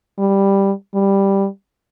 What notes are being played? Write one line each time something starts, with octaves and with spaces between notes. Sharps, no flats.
G3
G3